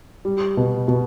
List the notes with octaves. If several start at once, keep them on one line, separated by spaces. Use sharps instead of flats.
G3
B2
B2